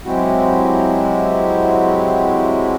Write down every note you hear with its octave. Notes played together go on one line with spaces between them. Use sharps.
F#3 G#3 C4 E4 F#4 G4